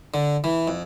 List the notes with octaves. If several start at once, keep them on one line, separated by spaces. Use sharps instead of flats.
D3
E3
F2